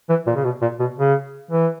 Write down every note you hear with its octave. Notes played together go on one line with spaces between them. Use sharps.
E3
A#2
C#3
B2
A#2
B2
C#3
E3